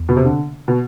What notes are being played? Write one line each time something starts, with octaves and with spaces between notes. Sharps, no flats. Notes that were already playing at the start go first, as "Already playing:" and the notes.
Already playing: E2
B2
C3
D3
B2